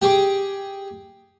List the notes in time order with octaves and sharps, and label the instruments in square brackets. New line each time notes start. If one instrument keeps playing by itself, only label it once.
[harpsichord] G4 G#4 D6